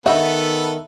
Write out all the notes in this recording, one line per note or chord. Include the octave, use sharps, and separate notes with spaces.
D#3 B3 D#4 F#4 A4 B4 E5